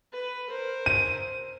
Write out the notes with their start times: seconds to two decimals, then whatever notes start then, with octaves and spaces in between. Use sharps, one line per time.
0.12 B4
0.49 A#4 C5
0.86 D#7